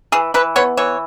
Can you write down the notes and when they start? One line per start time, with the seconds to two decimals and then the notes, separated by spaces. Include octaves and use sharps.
0.12 E3 G#4
0.34 E3 B4
0.56 B3 C#5
0.77 E3 C#5